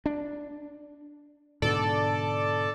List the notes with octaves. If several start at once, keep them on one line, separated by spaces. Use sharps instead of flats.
D4
G#2 B2 D3 A4 D5